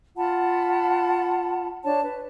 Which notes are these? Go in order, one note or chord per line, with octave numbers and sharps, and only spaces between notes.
F4 F#5 A5 B5
D4 C#5 A5
B4